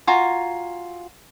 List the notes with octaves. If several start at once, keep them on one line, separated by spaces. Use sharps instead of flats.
F4 F#4 G#5 A#5